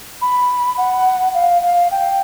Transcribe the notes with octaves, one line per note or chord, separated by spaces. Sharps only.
B5
F#5
F5
F5
G5